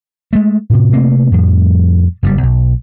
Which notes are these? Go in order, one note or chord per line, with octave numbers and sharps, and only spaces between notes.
G#3 A3
A2 C3
C3 A3 A#3 C4
F2 A2 F3 G3
F#1 G2 C#3 G3
B1